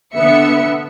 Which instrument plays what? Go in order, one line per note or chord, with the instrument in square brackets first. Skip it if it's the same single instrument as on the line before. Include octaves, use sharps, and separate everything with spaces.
[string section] D3 B3 E5 C#7